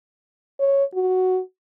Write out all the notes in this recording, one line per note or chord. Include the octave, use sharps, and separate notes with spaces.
C#5
F#4